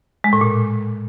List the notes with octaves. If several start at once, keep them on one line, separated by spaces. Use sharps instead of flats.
G#3
A2
A#2